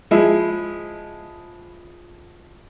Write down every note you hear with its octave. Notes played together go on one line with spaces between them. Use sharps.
F3 G#3 E4